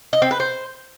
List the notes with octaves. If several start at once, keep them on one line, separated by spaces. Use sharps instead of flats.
D#5
C4
B4
C5